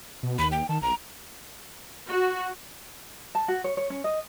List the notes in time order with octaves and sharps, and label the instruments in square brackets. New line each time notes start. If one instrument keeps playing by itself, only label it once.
[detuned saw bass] B2
[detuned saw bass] D#2 [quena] B5
[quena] G5
[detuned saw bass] D#3 [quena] A5
[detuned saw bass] B1 [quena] A#5
[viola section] F#4
[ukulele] A5
F#4
C#5
C#5
C#4
D#5